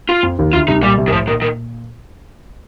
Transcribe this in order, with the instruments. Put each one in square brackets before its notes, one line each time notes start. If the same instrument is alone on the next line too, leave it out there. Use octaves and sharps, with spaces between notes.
[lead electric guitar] F4
[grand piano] F2 F3
D#2 D#3
[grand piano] D2 D3 [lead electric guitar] F4
[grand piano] C2 C3 [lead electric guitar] D#4
[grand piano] A#2 [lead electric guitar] G3
[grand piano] C2 C3
[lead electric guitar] D#3
[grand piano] A2 [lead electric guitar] F3
[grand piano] A#2 [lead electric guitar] D#3
[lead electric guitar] D#3